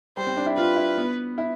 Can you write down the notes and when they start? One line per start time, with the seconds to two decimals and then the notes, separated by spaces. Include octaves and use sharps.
0.17 G3 C5
0.27 C4
0.37 D4
0.46 E4
0.57 F4 B4
0.76 E4
0.98 B3
1.38 E4